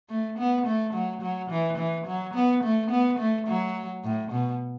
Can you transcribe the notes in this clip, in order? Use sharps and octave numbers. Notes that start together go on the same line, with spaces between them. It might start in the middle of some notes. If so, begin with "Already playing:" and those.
A3
B3
A3
F#3
F#3
E3
E3
F#3
B3
A3
B3
A3
F#3
A2
B2